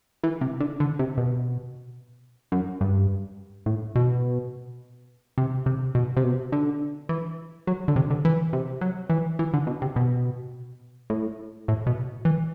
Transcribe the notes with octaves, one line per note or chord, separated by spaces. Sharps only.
E3
C3
D3
D3
C3
B2
F#2
G2
A2
B2
C3
C3
B2
C3
B2
D3
E3
F#3
D3
C3
D3
E3
C3
F#3
E3
E3
D3
B2
C3
B2
A2
A2
B2
E3